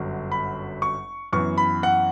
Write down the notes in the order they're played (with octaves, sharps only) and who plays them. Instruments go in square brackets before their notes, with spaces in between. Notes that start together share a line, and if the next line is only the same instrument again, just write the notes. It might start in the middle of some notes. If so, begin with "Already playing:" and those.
Already playing: [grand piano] G1 F#2 D3 F#3
B5
C#6
F#2 E3 B3 C#6
B5
F#5